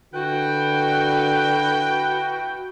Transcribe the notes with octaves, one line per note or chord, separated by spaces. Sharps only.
D3 E4 F#4 B4 G5